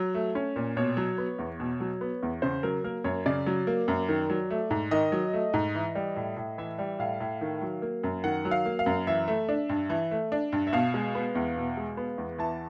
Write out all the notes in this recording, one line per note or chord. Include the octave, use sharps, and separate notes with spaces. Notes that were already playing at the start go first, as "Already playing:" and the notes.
Already playing: F#3
A3
C#4
A#2
B2 C#5
F#3
B3
E2
B2
F#3
B3
E2
C#3 C5
F#3 A#4
A#3 A#4
F#2 C#5
C#3 D5
F#3
A#3
F#2
D#3
F#3
A3
G#2
D#3 D#5
F#3
A3
G#2
E3
G3
A2
A2
E3 E5
G3
A2 F5
A2
D#3
F#3
A#3
F#2
D#3 F#5
F#3
F5
A#3
F5
F#2
E3 E5
A3
D4
G2
E3
A3
D4
G2
E5
B2 F5
G#3
B3
E2
B2
G#3
B3
E2
E3 A5